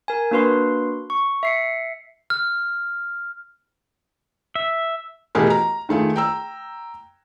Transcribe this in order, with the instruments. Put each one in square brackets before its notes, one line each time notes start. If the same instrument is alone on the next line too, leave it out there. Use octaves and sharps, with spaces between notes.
[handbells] A#4 G#5
A#3 D4 F#4 B4 F5 C6
C#6
E5 C7 C#7
[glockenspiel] F6
[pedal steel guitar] E5
[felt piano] B2 E3 A3 G4 G#4 A#4
A#5
D#3 A3 F4 G#4
G5 A#5 E6